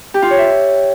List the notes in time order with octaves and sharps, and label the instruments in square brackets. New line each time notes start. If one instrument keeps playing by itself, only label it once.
[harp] G4
F4
C#5
E5